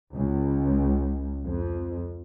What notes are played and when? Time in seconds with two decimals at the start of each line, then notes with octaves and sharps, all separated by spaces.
0.13 C#2
1.46 F2